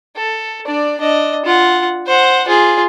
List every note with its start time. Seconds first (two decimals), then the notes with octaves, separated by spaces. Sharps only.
0.16 A4
0.67 D4 D5
1.00 D4 D#5
1.45 F4 F#5
2.07 C5 F#5
2.48 F4 G#4